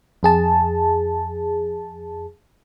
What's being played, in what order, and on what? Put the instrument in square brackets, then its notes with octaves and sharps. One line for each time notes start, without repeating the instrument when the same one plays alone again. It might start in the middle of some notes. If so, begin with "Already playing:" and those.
[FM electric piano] F2 G#4 A5